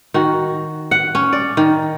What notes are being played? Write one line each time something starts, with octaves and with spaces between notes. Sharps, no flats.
D#3 F#4
F#5
C#4
D5
D#3